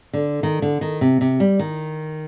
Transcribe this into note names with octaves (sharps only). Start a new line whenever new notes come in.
D3
D#3
D3
D#3
C3
C3
G3
D#3